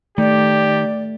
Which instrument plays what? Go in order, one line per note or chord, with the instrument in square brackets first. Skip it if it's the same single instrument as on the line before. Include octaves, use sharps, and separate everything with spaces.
[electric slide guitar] D#3 [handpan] A3 [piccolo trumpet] G4 [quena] D5